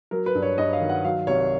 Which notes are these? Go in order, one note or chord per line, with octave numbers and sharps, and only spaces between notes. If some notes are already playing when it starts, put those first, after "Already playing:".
F#3 A#4
B4
G2
C#5
G2 D#5
F5
D#3
F#5
F#3 F5
C2 C#5